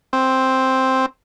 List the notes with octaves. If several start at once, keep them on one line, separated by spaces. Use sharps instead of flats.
C4